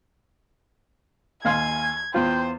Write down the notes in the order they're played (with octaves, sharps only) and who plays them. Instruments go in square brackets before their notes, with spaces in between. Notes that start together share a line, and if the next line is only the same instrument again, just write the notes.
[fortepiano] D#2 F5 C6 [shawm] G#5 [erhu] G#6
[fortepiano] E2 F4 [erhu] C5 [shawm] G5